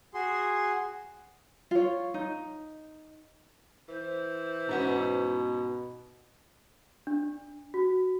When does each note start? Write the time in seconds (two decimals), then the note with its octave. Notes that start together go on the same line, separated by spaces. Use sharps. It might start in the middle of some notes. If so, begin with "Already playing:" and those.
0.14 F#4 G#4 C6
1.71 F4 C#5
2.14 D#4
3.89 E3 C5
4.69 G#2 B2 B3 C#4
7.07 D4
7.74 F#4